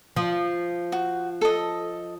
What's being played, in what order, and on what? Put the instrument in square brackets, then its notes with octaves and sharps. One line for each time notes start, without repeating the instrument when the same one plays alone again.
[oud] F3
[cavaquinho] F#4
A4 D#5